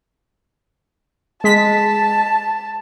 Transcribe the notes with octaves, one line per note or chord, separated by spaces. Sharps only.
G#3 A5 B6